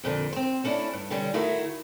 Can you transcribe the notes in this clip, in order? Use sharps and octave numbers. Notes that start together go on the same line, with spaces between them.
F2 A#2 D3
C4 C5
A3 C#4 D4 E4
G2
B2 D3 G3 C#4
D#3 A3 E4 F#4